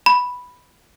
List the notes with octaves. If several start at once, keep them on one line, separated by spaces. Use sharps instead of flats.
B5